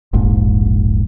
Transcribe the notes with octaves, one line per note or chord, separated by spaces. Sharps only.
E1 A#1 G#2